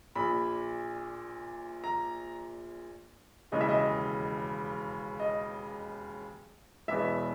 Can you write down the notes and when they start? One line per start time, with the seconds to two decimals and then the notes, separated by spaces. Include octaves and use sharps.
0.15 A#1 A#2 B5
1.84 A#5
3.52 E1 D#2 C#3 E3 D#5
3.61 E5
3.69 D#5
5.20 D#5
6.88 E1 E2 B2 E5